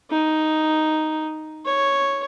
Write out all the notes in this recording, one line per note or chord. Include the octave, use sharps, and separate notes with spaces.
D#4
C#5